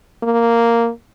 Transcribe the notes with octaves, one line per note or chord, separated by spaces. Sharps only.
A#3